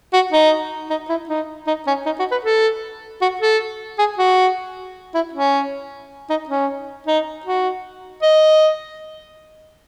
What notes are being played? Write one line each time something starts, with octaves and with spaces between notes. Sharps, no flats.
F#4
D#4
D#4
E4
D#4
D#4
C#4
D#4
F#4
B4
A4
F#4
A4
G#4
F#4
E4
C#4
D#4
C#4
D#4
F#4
D#5